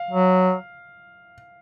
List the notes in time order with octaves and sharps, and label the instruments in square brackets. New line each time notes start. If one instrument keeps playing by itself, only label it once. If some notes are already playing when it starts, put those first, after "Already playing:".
Already playing: [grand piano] F5
[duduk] F#3